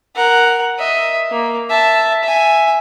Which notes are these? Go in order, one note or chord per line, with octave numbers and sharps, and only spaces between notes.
A#4 F#5
D#5 E5
A#3
E5 A5
E5 G#5